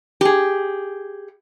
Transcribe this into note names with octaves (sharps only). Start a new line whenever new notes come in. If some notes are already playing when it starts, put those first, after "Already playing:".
G4 G#4